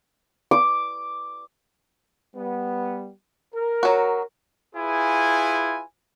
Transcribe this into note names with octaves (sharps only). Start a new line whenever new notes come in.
D6
G3 B3
A#4
F#3 F#4
E4 F4 G#4 B4 G#5